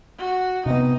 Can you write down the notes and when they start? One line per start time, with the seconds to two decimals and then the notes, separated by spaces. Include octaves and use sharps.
0.18 F#4
0.66 C3 B3 D#4